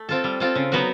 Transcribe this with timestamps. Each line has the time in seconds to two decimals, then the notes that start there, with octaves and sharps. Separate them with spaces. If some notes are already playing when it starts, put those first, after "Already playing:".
Already playing: A3
0.09 C4 F4 A4
0.24 G3
0.40 C4 F4 A4
0.55 C#3
0.72 F#3 B3 D#4 F#4